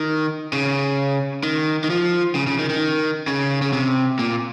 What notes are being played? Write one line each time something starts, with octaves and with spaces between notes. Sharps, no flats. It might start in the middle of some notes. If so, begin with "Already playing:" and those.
Already playing: D#3
C#3
D#3
D#3
F3
C#3
C#3
D#3
D#3
C#3
C#3
C3
A#2